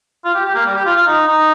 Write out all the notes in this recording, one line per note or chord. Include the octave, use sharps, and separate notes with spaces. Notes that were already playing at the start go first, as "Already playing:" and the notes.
F4
G4
G4
A#3
G3
G4
F4
F4
D#4
D#4